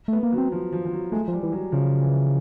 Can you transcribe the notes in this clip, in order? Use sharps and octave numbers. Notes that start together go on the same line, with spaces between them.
A3 B3
A#3
F#3
C4
F3
F3
F3
F#3
G#3 A3
F3 G3
E3
F#3
C#3 F3
E3